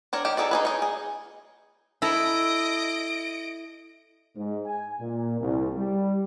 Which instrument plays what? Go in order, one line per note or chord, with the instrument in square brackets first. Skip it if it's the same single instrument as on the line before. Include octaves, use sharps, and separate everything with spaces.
[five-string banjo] D4 A#4 C#5
D#3 G4
D#4 F#4 G#4 A4 D5
D#4 G#4 B4
D#4 C#5
G#4
[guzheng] E4 A4 A#5 [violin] D#5 D7
[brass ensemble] G#2
G#5
A#2
C2
G3